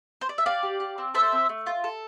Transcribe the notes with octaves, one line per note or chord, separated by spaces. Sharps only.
C5
D5
E5
G4 D5 F5
G4
G4
C4
A4 C5 E5
C4
A3
F4
A4